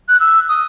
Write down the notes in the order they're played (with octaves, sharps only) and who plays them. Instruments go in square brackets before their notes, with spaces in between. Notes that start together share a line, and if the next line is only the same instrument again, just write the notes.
[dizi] F#6
E6
D#6